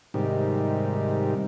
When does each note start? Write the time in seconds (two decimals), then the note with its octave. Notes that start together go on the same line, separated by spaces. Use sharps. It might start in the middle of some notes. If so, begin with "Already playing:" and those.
0.14 G#2 C3 D#3 G3